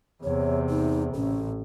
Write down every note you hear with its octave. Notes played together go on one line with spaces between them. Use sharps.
E2 C3 C#5
D#4
A1 C#4